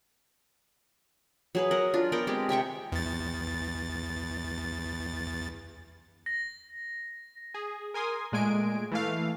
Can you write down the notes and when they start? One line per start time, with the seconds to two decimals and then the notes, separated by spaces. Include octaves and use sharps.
1.55 F#3 G#4 B4
1.71 A#4 F#5
1.94 D4 F4
2.12 B3 A#4 D5 G5
2.27 G#3 C4 G4
2.49 C3 E5 G5 C#6
2.92 E2 A6
6.26 A#6
7.54 G#4
7.94 A#4 G#5 C6 D#6
8.32 A#2 G#3 A3 G#5 D7
8.91 E3 A3 F5